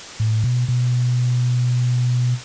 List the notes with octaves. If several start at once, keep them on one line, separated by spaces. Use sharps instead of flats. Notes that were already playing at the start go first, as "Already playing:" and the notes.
A2
B2
B2